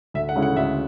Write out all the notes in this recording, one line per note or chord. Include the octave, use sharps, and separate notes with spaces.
D2 E5
F#5
C#3 G#3 C#4 E4
F#5
D2 E5